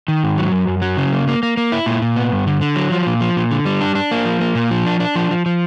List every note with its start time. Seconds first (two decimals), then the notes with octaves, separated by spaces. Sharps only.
0.08 D#3
0.23 G#2
0.37 F#3
0.52 F#2
0.67 F#2
0.82 F#3
0.97 C#3
1.12 A#3
1.28 A#3
1.43 A#3
1.57 A#3
1.72 E4
1.86 A#2
2.02 A#2
2.16 B3
2.32 G2
2.47 D3
2.61 D3
2.76 F#3
2.92 F3
3.07 A#2
3.21 F3
3.36 A#2
3.51 D3
3.65 G3
3.81 D4
3.95 D4
4.11 A#3
4.25 F3
4.40 A#3
4.55 A#2
4.71 F3
4.86 D4
5.00 D4
5.16 F3
5.31 F3
5.46 F3